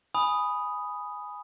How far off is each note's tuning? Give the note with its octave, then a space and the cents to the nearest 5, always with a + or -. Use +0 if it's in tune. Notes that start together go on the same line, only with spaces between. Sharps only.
G#5 +0 B5 +0 D#6 +0